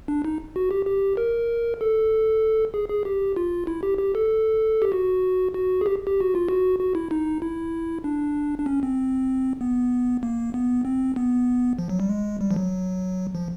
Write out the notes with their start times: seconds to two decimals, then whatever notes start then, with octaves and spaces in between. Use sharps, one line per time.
0.08 D4
0.25 D#4
0.56 F#4
0.71 G4
0.86 G4
1.17 A#4
1.81 A4
2.74 G#4
2.89 G#4
3.05 G4
3.36 F4
3.67 E4
3.83 G4
3.99 G4
4.15 A4
4.82 G4
4.92 F#4
5.54 F#4
5.81 G#4
5.86 G4
6.07 G4
6.21 F#4
6.35 F4
6.49 F#4
6.80 F#4
6.95 E4
7.11 D#4
7.42 E4
8.04 D4
8.58 D4
8.66 C#4
8.83 C4
9.61 B3
10.23 A#3
10.54 B3
10.85 C4
11.16 B3
11.79 F3
11.89 F#3
12.00 G3
12.09 G#3
12.41 G3
12.51 F3
12.56 F#3
13.35 F3